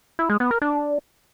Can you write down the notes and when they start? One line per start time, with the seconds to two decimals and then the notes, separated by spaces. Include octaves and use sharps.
0.19 E4
0.30 G#3
0.40 B3
0.51 A#4
0.62 D4